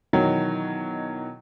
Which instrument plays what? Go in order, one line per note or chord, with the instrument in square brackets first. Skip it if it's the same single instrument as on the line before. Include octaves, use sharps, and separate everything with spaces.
[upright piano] B2 D#3 E3 F#3